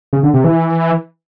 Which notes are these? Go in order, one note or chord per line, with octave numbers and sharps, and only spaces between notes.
C#3
D3
C3
E3